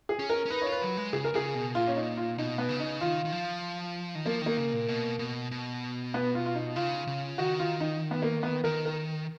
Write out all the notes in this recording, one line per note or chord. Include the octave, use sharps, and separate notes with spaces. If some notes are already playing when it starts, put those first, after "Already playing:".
G#4
C#4
A#4
C#4
D#4 B4
F4 C#5
B4
F#3
G#3
C#3 G#4
A#4
C#3 G#4
B2
A#2 F4
C#4
D#4
F4
B2 D#4
B3
C#3
D#4
D#3 F4
D#3
F3
D#3
F3 A#3
D#3 A#3
C#3
A#2
B2
B2
B2
B3
F4
F4
D#4
C#3 F4
C#3
D#3 F#4
F4
D#4
B3
A#3
B3
D#3 A#4
A#4